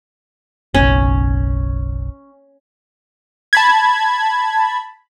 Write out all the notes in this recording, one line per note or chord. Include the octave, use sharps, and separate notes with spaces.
F#1 B1 C#4
A5 B5 G#6